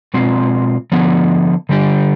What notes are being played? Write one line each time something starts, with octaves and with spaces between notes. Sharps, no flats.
B2 G#3 C4 F4
D3 F3 B3
D3 G3 D4 G4